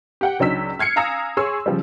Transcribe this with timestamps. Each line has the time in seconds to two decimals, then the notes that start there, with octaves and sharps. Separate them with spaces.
0.21 G4 F#5 G5
0.39 C#2 F#3 D4 D#4 E6 B6
0.79 F6 G#6 C7 C#7
0.96 F5 G#5 A#5 D#6 E6 A#6
1.37 G#4 C#5 C6 C#6 E6
1.66 C#3 F3 G3